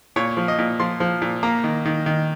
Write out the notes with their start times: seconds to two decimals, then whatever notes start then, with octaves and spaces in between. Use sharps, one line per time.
0.16 A#2 C#5
0.37 F3
0.48 D#5
0.59 A#2
0.80 F3 C6
1.00 F3
1.22 A#2
1.43 A#3 A#5
1.64 D#3
1.85 D#3
2.06 D#3